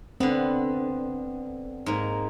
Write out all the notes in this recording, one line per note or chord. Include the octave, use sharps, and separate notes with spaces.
D3 B3 C4
G#2 A#3